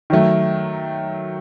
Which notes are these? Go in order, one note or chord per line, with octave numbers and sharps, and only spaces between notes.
D#3 F#3 A3